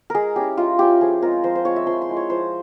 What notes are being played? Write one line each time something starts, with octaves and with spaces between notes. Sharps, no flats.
G#3 G#4 A#4
C#4 E4 G4
G#3 F4
C#4 E4 G4
F3 G#4
G#3 C4 F4 A#4
F3 C5
C5
G#3 C4 F4 C#5
E5
F3 C6
C6
G#3 E4
C#5
F3 C5